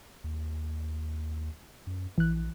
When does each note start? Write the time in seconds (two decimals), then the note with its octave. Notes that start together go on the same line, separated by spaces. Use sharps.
0.24 D#2
1.87 F#2
2.18 A#1 E3 F#6